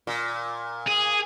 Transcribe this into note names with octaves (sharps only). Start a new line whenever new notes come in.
A#2
G#4